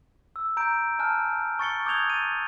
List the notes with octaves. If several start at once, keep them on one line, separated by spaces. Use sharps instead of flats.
E6
A#5 G6 D7
G#5 A5 F6 F#6
C#6 A6 C#7 G7
D6 D#6 G6 G#6 F7 G7
A6 D#7